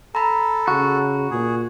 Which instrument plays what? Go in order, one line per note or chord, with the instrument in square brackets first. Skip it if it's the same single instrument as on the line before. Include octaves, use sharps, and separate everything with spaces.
[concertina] A4 [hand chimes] A#5 B5
[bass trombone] C#3 [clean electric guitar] F#4
[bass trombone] A#2 [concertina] G#4